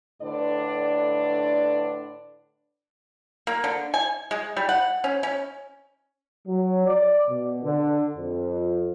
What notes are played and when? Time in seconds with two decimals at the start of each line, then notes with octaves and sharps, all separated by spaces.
0.22 A2 D3 D4 B4 D5
3.47 A#3
3.64 D3
3.94 G#5
4.31 G#3
4.57 G3
4.69 F#5
5.04 C#4
5.23 C#4
6.47 F#3
6.87 D5
7.30 B2
7.64 D3
8.17 F2